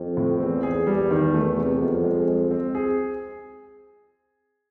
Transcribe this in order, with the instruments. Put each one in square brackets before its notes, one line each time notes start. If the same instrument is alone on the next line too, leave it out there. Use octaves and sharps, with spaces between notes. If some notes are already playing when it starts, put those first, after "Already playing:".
Already playing: [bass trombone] F2
[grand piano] A2
[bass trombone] E2 [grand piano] C4
[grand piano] G#4
G3
D#3
A3
C3
[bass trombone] F2 [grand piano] B3
[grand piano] G#3
G#3
C4
G#4